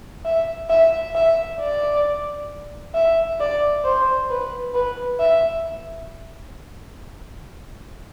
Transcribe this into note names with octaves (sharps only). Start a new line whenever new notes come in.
E5
E5
E5
D5
E5
D5
C5
B4
B4
E5